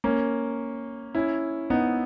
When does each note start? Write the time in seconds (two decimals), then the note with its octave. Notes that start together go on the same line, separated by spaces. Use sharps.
0.04 A#3 C#4
1.15 C#4 E4
1.70 B3 D#4